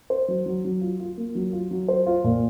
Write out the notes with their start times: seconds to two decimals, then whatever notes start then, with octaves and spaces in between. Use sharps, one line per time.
0.10 C5
0.28 F#3
0.46 F#3
0.65 F#3
0.81 F4
1.00 F4
1.17 A#3
1.35 F#3
1.53 F4
1.71 F#3
1.88 C5
2.06 F4
2.24 A#2